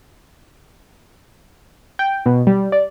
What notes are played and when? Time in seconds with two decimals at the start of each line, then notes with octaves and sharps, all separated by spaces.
1.99 G5
2.26 B2
2.47 G3
2.72 D5